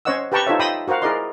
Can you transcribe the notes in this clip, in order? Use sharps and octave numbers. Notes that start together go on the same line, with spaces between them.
C#4 C5 C#5 D#5 F#5 E6
G4 B4 G5 A5 A#5 C#6
D#4 F4 A4 C5 C#5 E5
D#5 G5 B5 C6 D#6 E6
F#4 A#4 C5 F5 F#5
E4 G#4 A#4 D5 D#5 C6